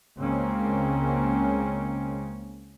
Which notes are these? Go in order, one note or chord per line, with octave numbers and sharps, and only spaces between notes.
C#2 C#3 G#3 A#3 C4 C#4